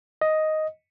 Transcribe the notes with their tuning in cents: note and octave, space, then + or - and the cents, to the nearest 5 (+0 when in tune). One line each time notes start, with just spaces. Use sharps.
D#5 +5